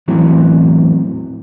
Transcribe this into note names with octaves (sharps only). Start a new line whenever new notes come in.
E2 A2 E3 F#3 C4